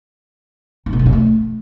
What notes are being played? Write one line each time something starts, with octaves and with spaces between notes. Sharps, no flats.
D#3
B2
G3
G2
A3